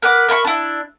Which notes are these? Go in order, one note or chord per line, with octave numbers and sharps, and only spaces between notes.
A#4 B4 F#5 D6
A#4 E5 B5 C#6
D4 E4